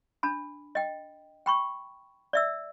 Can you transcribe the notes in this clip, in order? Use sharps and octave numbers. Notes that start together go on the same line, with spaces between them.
D4 A5 B5
D#5 G5
G5 B5 C#6
D5 E5 E6